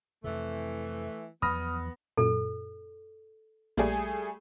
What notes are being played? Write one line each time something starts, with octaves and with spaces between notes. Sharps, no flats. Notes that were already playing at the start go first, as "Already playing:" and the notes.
F2 C3 E3 A3
E2 F3 F#3 B3 B5 D#6 F6 A#6
F#2 A#2 A4
A#1 G3 A3 A#3 G#4 D5